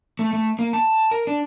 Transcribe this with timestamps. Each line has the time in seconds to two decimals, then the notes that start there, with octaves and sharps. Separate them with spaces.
0.19 A3
0.33 A3
0.59 A#3
0.73 A5
1.11 A#4
1.27 D4